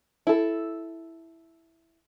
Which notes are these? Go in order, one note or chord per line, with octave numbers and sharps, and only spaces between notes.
E4 A4